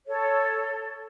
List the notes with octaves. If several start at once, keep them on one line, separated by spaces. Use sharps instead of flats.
A4 C#5